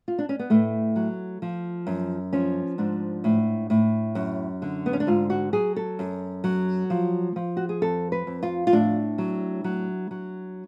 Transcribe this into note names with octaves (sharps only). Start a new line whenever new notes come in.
F4
D4
C#4
B3
A2 A3
F#3
F3
F#2
F3 C#4
G#2 D4
A2
A2
F#2
D3
B3
C#4
D4
G#2 F4
F#4
F#3 G#4
A4
F#2
F#3
F3
F3
F#4
G#4
F2 A4
B4
F2
F4
F4
A2 D4
F#3
F#3
F#3